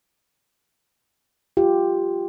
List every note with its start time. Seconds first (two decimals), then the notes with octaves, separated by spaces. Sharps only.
1.57 F4 G4